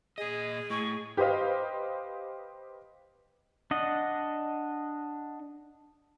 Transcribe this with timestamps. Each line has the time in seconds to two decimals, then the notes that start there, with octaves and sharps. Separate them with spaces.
0.18 A#2 G#4 D#5
0.70 A2 C#6
1.17 G4 B4 C5 D#5 F5
3.71 D4 D#5 F#5